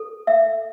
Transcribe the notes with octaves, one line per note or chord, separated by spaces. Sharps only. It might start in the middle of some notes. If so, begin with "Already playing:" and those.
Already playing: A4
E5